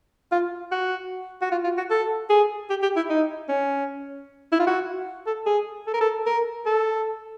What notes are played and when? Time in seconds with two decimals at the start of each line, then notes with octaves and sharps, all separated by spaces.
0.32 F4
0.72 F#4
1.41 F#4
1.51 F4
1.64 F4
1.77 F#4
1.91 A4
2.30 G#4
2.70 G4
2.82 G4
2.96 E4
3.10 D#4
3.49 C#4
4.52 E4
4.59 F4
4.67 F#4
5.27 A4
5.46 G#4
5.87 A4
5.94 A#4
6.01 A4
6.26 A#4
6.66 A4